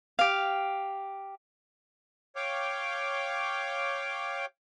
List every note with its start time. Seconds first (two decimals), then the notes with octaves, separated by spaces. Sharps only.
0.19 G4 F5
2.36 C#5 F5 G5 D6